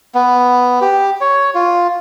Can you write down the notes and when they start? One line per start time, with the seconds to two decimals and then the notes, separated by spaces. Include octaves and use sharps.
0.15 B3
0.81 G4
1.21 C#5
1.54 F4